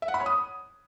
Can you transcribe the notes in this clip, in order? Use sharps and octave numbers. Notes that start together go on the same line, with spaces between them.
E5
F#5
B5
C#5
D#6